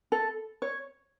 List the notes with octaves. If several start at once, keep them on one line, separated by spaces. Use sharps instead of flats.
A4
C#5